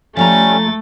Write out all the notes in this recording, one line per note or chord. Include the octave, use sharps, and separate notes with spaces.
F3 G3 A3 C#4 F4 A4 A#5 A6